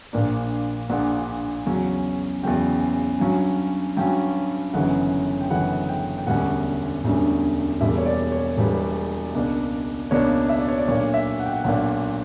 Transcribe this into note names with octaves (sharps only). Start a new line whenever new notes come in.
A#1 A#2 A#3 D4
A#1 A#2 A#3 D4 F#5
E2 C#3 F#3 C#4
E2 C#3 F#3 C#4 G5
G5
G2 F#3 C#4
G2 F#3 C#4 G5
G1 F#2 C#3 E3 F#5
G5
G1 F#2 C#3 E3 F#5
G5
G5
E1 D2 D3 G3 C#4 F#5
E1 D2 D3 G3 C#4
E1 E2 B2 G3 A#3 E5
C#5
D5
C#5
E1 E2 B2 G3 A#3 B4
C#2 B2 A#3 D4
C#2 B2 A#3 D4 C#5
E5
D5
C#5
D5
B1 A#2 A#3 D4 C#5
E5
F#5
G5
F#5
B1 A#2 A#3 D4 F#5